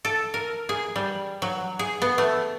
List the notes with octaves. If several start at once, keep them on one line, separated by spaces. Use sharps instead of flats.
A4
A#4
G#4
G3
F#3
G#4
B3
A3